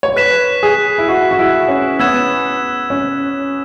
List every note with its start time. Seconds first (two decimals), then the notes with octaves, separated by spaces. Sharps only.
0.03 C#5
0.16 B4 F#6 B6 E7
0.63 G#4
0.98 E4
1.08 F#4
1.31 F#4
1.39 E4
1.68 C#4
1.99 B3 E6 G#6 E7
2.90 C#4